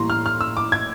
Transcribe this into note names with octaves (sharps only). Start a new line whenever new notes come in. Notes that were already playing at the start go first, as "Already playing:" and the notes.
Already playing: A2 E3 G3 A#3 A#5 C6
F6
F6
E6
D6
G#6